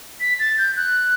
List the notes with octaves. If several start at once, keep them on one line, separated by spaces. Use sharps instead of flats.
B6
A6
G6
F#6